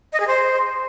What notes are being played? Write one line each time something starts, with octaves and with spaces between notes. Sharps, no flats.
D#5
G#4
C5